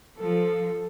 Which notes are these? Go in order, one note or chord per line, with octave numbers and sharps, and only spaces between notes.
F3 A4